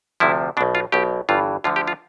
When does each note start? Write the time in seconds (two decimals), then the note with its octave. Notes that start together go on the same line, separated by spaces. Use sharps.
0.20 D2 C3 F3 E4
0.57 B2 D4
0.61 B1
0.75 F4
0.92 B1 B2 G4
1.29 G1 G2 E3 F4
1.64 D2 D3 F3 F4
1.76 G4
1.87 F4